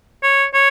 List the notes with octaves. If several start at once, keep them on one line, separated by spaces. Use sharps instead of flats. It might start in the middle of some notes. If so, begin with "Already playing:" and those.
C#5
C#5